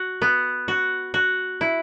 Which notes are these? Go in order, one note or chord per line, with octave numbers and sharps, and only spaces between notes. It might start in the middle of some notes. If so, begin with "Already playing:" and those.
Already playing: F#4
B3
F#4
F#4
E4